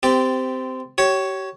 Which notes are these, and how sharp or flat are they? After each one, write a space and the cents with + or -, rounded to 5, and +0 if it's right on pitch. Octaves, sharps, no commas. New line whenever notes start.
C4 -20 G4 +0 D5 +0
G4 -35 C#5 +5